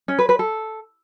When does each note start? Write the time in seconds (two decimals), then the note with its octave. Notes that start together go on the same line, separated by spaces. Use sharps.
0.08 C#4
0.19 B4
0.29 B4
0.39 A4